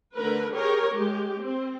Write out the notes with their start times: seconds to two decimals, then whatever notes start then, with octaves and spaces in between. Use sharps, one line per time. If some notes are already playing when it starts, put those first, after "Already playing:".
0.15 D3 A3 A#4 B4
0.53 G4 G#4 A#4 C#5
0.90 G#3 G4
1.41 C4